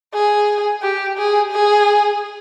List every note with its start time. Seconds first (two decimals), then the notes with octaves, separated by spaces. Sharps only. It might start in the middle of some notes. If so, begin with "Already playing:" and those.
0.13 G#4
0.82 G4
1.18 G#4
1.52 G#4